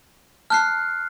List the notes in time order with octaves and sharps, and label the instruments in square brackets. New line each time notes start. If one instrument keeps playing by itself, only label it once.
[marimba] A5 [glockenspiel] F6 F#6 C7